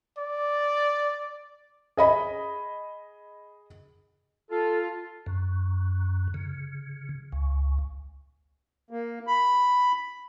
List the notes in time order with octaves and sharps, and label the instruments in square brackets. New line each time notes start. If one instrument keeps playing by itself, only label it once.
[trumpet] D5
[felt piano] G#4 D#5 B5
[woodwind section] F4 [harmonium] A4
[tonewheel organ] F#2
C#3
C#2
[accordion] A#3
B5